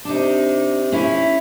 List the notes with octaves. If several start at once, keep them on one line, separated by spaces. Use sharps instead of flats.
C3 D4 D#4
C#4 D#4 E4